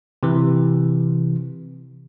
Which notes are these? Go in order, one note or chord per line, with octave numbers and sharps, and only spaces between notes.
C3 E3